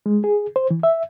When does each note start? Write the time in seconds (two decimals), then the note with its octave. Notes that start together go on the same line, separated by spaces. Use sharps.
0.06 G#3
0.24 G#4
0.56 C5
0.71 E3
0.83 E5